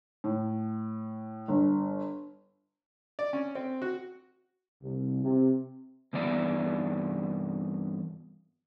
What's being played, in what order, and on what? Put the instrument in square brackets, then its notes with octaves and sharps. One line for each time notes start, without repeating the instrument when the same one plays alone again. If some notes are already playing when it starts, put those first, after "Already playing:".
[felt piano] A2
G1
[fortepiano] D5
C#4
C4
F#4
[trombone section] C2
C3
[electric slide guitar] G2 E3 B3 D5